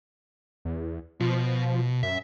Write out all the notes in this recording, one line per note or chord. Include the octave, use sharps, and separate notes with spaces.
E2
B2 F3
F#2 E5